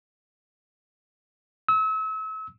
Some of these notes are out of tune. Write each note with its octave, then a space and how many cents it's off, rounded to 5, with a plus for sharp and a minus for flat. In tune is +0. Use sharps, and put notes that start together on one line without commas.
E6 -35